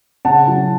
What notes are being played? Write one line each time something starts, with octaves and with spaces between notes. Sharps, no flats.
C#3 F#5 A5
F#3 C#4 E4